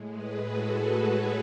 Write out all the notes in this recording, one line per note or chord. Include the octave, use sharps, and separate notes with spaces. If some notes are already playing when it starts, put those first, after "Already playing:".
Already playing: A2 G#3
G#4 B4
F#4 A4
G#4 B4
A4 C#5